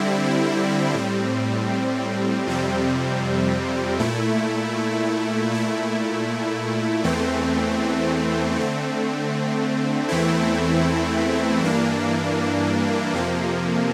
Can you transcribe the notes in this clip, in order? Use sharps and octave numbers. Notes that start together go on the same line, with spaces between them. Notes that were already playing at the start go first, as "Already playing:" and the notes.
Already playing: D3 G3 C4 E4
A2 G3 C4
F2 C3 G3 C4
A#2 A3 E4
A#2 A3 E4
E2 E3 A3 C4
D3 A3 C4
E2 E3 A3 C4 E4
G2 E3 A#3 D4
F2 C3 F3 A#3